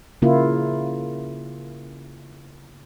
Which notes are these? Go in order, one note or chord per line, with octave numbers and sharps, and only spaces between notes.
C#3 A#3 E4 F4